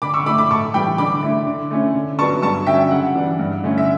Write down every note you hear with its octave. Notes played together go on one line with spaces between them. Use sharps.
D3 B5 D6
C#6 E6
A3 E4 B5 D6
B5 D6
A2 A5 C#6
E3 G3 G5 B5
D3 B5 D6
A3 E4
D3
A3 C#4 E4
D3
F#3 B3 D4 A5 C#6
G2 A5 C#6
D3 F#3 C#4 E5 G5
C#3 F#5
E3 G3 D4
G2
D3 A3 C#4 E4
E5